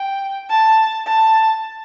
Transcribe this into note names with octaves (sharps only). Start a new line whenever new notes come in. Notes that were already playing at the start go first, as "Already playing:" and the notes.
Already playing: G5
A5
A5